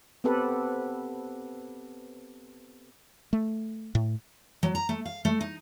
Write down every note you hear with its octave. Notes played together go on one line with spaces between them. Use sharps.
B3 C4 G4 A4 B4
A3
A2
F#3
A#5
A3
F5
A3
D#4